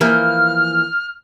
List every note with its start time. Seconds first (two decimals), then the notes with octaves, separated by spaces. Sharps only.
0.01 E3 F3 A#3 F6